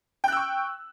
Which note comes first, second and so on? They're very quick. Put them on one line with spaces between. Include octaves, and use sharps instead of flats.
G5 F#6 E6 C#6